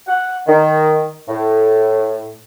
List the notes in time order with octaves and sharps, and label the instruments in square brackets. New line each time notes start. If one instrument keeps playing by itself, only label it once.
[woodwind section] F#5
D#3
A2